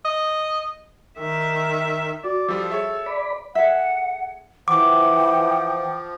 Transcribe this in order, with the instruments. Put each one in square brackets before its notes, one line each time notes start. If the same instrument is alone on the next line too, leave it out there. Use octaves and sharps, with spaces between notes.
[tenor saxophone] D#5
[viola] D#3 E5
[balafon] F#4 [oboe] D5
[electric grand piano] F3 G3 F4 [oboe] A4
[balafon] G#4 C#6 [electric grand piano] C#5 E5
[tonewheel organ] D5 B5
[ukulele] G#4 A4 E5 [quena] F#5
[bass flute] E3 [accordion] F3 [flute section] F#5 G5 [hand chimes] D6